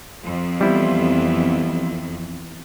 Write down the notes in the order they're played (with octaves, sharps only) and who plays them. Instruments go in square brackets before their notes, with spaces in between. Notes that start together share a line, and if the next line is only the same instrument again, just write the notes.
[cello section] F2
[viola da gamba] E3 B3 [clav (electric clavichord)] G3 E4